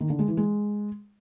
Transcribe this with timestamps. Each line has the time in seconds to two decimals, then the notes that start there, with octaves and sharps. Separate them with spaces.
0.01 D#3
0.10 D3
0.19 G#3
0.28 E3
0.37 G#3